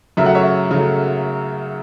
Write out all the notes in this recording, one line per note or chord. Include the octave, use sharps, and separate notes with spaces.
F#2 C#3 F#3 A3 E5
F#5
C#5 E5
C#3 F#3 A3